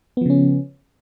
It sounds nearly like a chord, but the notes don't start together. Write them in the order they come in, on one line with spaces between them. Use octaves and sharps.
B3 F3 C#3 C#4